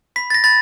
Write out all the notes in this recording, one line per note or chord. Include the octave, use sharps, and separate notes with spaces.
B5 B6
A6
A#6
B5 A6